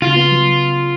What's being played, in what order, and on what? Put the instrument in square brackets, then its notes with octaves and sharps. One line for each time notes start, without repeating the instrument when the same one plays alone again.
[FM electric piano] C#3 [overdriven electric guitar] F4
[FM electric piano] B3
F#3